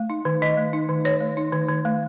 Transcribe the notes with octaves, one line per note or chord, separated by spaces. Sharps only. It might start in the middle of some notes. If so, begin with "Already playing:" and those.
Already playing: A3
D#4
D#3
D#3 D#5
A3
D#4
D#3
D#3 C#5
A3
D#4
D#3
D#3
A3